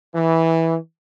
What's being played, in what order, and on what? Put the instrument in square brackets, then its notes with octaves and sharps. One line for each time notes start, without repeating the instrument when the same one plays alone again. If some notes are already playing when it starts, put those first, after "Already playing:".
[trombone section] E3